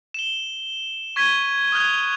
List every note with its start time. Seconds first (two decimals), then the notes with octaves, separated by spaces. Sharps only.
0.14 E7 G7
1.16 C#6 G#6 B6 D#7 G7
1.72 D#6 F6 F#6 G#6